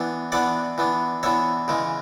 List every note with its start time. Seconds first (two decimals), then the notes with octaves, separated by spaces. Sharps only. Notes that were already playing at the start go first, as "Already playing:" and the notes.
Already playing: E3 B3 D4
0.32 E3 B3 D4 D5 F#5
0.78 E3 B3 D4
1.23 E3 B3 D4 C#5 E5
1.68 C#3 E3 G#3